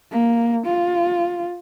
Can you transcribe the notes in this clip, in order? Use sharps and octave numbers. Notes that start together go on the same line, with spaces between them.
A#3
F4